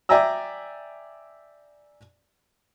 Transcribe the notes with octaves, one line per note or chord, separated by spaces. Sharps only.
D5 E5 G5 G#5 A#5 E6